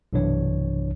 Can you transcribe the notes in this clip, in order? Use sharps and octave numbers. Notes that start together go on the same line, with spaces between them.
B1 G2 C3 E3 D4 C#5